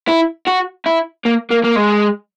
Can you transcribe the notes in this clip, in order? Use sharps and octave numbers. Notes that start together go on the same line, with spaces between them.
E4
F#4
E4
A#3
A#3
A#3
G#3